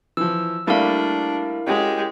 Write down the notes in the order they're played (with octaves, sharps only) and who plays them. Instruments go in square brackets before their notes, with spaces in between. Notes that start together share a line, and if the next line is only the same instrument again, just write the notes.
[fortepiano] E3 F3 [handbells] E6
[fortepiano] G3 A3 A#3 [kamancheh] D4 [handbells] E4 A#4 F5
[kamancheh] G#3 G4 [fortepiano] C#4 F#4